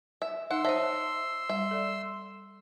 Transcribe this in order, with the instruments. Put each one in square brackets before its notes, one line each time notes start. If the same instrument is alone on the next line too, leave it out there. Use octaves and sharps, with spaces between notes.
[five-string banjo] E5
[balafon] D#4 [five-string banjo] F#5 [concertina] C6 E6
[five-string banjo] D#4 E5 [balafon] C5 C#5 A5
[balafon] G3 [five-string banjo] E5
[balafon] A4 D5